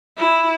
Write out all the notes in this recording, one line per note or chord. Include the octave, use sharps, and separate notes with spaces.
E4